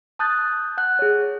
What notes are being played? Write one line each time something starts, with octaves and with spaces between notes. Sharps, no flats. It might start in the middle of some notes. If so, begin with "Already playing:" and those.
A5 D#6 F#6 G6 A6
F#5 F#6
G#4 C#5